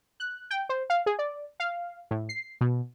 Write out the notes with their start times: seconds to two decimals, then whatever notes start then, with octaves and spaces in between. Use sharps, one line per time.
0.20 F#6
0.50 G5
0.69 C5
0.90 F5
1.06 G#4
1.19 D5
1.60 F5
2.11 A2
2.29 C7
2.61 B2